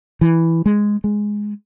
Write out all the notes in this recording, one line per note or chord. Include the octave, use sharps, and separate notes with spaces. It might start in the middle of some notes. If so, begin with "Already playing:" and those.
E3
G#3
G#3